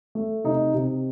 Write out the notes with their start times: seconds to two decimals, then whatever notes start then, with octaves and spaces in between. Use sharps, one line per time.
0.15 A3
0.44 C3 D#4
0.74 C3